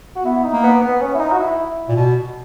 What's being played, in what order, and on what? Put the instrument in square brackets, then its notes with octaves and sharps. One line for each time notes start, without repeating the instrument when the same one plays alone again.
[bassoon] F#4
[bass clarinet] B3 [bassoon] E4
[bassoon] D#4
[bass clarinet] A#3
[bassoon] B3
B3
C#4
E4
D#4
F#4
E4
[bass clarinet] A#2
B2